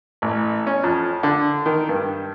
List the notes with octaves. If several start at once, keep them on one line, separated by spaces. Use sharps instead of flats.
A1
C#4
F2
D3
D#3
G2